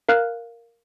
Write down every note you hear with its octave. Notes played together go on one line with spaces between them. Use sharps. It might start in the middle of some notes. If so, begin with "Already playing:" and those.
A#4 F5 F6 F#6